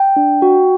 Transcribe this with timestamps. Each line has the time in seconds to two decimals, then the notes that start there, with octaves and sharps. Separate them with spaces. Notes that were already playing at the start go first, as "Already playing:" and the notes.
Already playing: G5
0.16 D4
0.42 F#4